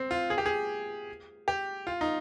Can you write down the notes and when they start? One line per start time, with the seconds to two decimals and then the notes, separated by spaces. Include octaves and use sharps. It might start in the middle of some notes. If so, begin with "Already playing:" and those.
Already playing: C4
0.11 F4
0.30 G#4
0.38 G4
0.46 G#4
1.48 G4
1.87 F4
2.01 D#4